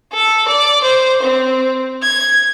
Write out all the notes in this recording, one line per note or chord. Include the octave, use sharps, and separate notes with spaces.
A4
D5
C5
C4
G#6